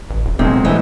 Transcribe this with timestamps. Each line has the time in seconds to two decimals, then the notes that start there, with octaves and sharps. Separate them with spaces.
0.10 A1
0.25 D#1
0.39 D#1 B1 G#3 C4
0.65 A2 E3 D#5